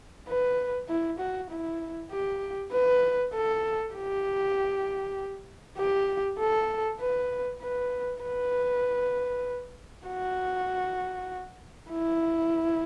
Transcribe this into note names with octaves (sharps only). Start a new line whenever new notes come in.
B4
E4
F#4
E4
G4
B4
A4
G4
G4
A4
B4
B4
B4
F#4
E4